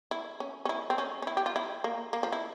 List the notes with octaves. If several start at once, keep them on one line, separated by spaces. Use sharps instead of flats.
E4
C#4
C#4
E4
C4
C#4
C#4
E4
G4
F4
E4
A#3
A#3
F3
E4